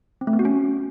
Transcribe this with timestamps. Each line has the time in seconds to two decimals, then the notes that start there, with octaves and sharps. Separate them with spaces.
0.21 C4
0.27 A3
0.33 B3
0.39 F#4
0.45 C#4